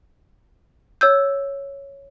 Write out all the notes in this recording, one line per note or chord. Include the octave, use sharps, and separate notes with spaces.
C#5 E6 G6